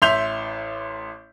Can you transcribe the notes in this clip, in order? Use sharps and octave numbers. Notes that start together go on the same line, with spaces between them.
A1 E5 C6 G6 F7